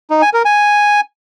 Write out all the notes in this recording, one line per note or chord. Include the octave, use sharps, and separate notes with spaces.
D#4
G#5
A#4
G#5